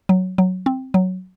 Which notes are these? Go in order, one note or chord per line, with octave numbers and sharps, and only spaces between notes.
F#3
F#3
C4
F#3